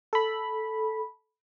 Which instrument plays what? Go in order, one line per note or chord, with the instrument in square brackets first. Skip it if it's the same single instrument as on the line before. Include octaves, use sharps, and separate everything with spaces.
[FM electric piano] A4 B5